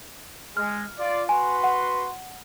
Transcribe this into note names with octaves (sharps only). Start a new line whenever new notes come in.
G#3 F6
F4 D5
F#4 B4 G#5 C6
F#5